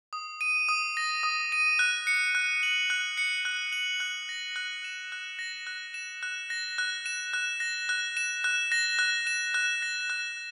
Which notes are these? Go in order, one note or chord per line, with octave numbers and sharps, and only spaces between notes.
D#6
D#7
D#6
A#6
D#6
D#7
F#6
C#7
F#6
F#7
F#6
C#7
F#6
F#7
F#6
A#6
F#6
E7
F#6
A#6
F#6
E7
F#6
A#6
F#6
E7
F#6
A#6
F#6
E7
F#6
A#6
F#6
E7
F#6
A#6
F#6